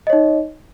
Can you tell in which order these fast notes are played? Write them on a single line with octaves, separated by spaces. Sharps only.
D#5 C#5 D#4